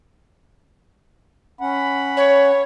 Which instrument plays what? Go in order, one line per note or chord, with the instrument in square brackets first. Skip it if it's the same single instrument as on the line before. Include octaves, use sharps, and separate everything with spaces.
[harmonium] C#4 F#5 [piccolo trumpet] B5
[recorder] C#5